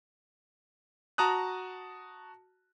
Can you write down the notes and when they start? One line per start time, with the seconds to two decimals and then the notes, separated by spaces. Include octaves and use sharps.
1.18 F#4 A5 A#5 D#6 F#6